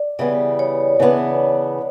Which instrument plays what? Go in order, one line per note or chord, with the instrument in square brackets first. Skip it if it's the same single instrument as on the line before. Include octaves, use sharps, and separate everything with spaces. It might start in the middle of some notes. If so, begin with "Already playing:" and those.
Already playing: [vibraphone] D5
[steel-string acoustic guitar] C#3 E3 G3 B3 [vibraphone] D5
[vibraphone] C#5
[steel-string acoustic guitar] C#3 E3 G3 B3 D4